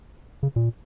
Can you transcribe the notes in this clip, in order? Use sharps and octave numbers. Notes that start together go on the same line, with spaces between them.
C#3
A#2